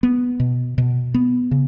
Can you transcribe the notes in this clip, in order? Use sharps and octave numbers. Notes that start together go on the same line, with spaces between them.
B3
B2
B2
B3
C#3